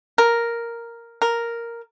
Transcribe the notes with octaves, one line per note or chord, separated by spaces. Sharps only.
A#4
A#4